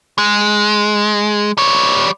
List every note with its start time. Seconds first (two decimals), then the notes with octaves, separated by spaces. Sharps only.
0.18 G#3
1.57 G3 C#5